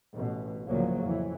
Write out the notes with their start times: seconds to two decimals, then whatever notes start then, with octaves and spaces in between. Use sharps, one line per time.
0.15 A1 B2
0.68 D2 A2 C#3 F3 F#3 A#3
1.04 F2 E3